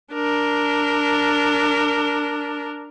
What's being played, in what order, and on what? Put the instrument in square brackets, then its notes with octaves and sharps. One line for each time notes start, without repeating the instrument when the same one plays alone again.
[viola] D4 A#4